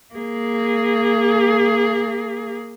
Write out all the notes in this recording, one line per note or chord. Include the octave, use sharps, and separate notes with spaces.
A#3 G#4